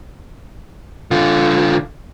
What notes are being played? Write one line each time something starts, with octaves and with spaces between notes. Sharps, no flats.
D3 F4